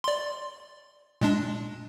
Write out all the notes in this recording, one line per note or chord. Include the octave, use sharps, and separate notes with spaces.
D5 C6
A#2 G#3 D4